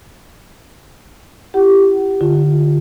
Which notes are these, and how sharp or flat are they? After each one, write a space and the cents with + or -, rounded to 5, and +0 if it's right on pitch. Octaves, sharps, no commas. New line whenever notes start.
E4 +35 G4 +0 F#5 +30
D3 +10 F4 +0